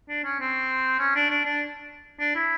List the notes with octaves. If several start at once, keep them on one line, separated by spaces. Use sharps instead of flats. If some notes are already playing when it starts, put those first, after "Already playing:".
D4
C#4
C4
C#4
D4
D4
D4
D4
E4